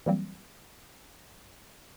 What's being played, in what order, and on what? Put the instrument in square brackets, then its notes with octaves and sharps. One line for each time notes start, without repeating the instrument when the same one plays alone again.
[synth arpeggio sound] E3 F#3 G3 A#3 C4